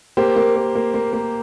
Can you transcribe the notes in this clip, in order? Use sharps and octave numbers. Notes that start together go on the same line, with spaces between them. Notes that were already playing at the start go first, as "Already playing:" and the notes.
A#3 G4 C5
A#3
A#3
A#3
A#3
A#3